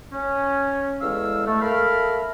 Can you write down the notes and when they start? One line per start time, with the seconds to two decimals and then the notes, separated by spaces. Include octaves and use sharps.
0.12 C#4
1.01 E2 G#3 A4 F5 E6
1.46 A3
1.62 A4 A#4 E5 F5 B5 F6